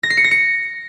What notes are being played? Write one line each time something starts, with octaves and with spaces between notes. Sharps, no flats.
A#6
C7
C#7
A#6
C#7